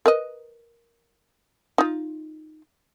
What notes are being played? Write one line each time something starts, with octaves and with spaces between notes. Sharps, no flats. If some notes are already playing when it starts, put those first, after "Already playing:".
A#4 B4 D#5
D#4 F4